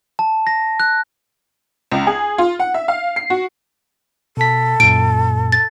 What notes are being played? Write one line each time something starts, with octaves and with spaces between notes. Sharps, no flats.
A5
A#6
F#6
C#2
G#4
F4
F#5
E5
F5
C7
F#4
B2 A4 B6
F#2 A#2 D7
A6